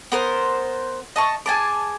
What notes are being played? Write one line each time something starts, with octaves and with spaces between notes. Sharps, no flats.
B3 A#4 C5
D#5 A5 C#6
G#4 G#5 A5 D6